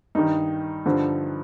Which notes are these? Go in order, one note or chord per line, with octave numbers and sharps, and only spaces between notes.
G2 D#3 D#4
G2 D3 F3